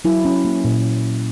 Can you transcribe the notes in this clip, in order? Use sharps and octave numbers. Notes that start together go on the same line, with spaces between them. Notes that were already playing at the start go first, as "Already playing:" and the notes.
F#3 E4
C#4
A#3
A#2